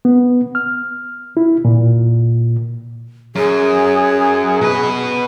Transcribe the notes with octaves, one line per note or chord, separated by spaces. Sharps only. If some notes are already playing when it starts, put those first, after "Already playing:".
B3
F6
E4
A#2
F#2 G#4
B2 B4